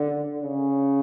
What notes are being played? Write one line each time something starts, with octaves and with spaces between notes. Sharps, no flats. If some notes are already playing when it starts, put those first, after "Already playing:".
Already playing: D3
C#3